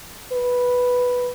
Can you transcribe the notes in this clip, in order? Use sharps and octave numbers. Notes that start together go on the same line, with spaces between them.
B4